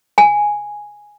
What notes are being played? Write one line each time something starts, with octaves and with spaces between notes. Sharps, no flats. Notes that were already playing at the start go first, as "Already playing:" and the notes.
G#5